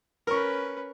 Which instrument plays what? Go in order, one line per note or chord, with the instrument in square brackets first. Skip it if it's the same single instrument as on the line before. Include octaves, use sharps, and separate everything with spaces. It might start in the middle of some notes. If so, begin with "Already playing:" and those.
[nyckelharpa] C#4 B4 [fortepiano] A#4 C#6